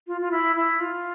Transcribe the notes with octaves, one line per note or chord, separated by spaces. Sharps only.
F4
F4
E4
E4
F4